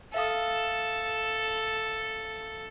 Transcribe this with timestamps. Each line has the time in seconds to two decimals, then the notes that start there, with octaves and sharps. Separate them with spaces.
0.14 A4 E5 F5 D#6